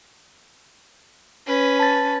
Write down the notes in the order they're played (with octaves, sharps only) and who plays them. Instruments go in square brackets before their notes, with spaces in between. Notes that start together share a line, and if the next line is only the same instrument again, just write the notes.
[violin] C#4 B4
[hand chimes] A5 A6